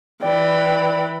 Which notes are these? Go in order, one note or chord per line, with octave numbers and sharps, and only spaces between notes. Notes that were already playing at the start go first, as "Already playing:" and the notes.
E3 D5 G5 B5